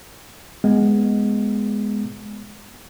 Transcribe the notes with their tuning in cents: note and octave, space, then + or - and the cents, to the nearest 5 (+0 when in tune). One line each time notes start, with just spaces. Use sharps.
G#3 +0 B3 +0